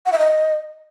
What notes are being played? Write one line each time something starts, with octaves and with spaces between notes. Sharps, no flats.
F#5
E5
D#5